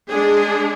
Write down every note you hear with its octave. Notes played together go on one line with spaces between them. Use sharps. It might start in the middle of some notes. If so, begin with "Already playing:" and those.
G#3 D4 G#4